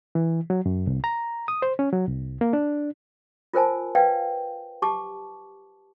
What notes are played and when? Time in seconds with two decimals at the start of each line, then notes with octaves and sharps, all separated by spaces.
0.15 E3
0.50 F#3
0.66 F#2
0.87 C2
1.04 A#5
1.48 D#6
1.62 C5
1.79 C#4
1.93 F#3
2.08 C2
2.41 A#3
2.53 D4
3.53 F4 A#4 C5 G#5 A5
3.95 B4 D5 F5 G5
4.82 G4 A5 C#6 D6